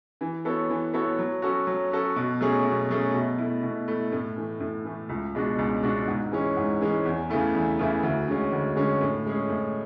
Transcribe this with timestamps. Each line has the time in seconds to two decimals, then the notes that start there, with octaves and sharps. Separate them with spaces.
0.21 E3
0.45 B3 F#4 A4 C#5
0.70 E3
0.94 B3 F#4 A4 C#5
1.19 F#3
1.42 C#4 F#4 A4
1.67 F#3
1.91 C#4 F#4 A4
2.16 B2
2.41 F#3 A3 C#4 G#4
2.65 B2
2.90 F#3 A3 C#4 G#4
3.14 B2
3.38 A3 E4
3.63 B2
3.88 A3 E4
4.12 A2
4.36 E3 A3
4.60 A2
4.85 E3 A3
5.09 C#2
5.35 B2 G#3 D4 F#4
5.58 C#2
5.83 B2 G#3 D4 F#4
6.08 G#2
6.32 E3 G#3 C#4
6.57 G#2
6.81 E3 G#3 C#4
7.05 E2
7.30 C#3 E3 A3 E4
7.54 E2
7.79 C#3 E3 A3 E4
8.03 D2
8.28 D3 G#3 C#4
8.52 D2
8.76 D3 G#3 C#4
9.01 A2
9.26 G#3 C#4 G#4
9.50 A2